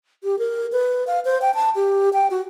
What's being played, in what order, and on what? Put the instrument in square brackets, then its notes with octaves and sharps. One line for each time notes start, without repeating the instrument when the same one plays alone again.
[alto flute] G4
A#4
B4
F5
C5
G5
A5
G4
G5
F#4